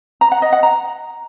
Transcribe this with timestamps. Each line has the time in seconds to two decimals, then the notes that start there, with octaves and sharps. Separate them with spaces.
0.21 A#5
0.32 F#5
0.42 D#5
0.52 F#5
0.63 A#5